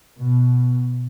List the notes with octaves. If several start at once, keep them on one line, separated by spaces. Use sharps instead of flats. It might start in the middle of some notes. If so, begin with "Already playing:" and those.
B2